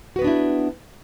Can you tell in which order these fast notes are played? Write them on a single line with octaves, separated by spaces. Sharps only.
F#4 B4 B3 D4 E4